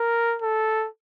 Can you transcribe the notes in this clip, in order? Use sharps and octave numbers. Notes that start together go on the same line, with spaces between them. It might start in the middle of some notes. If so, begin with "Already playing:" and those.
Already playing: A#4
A4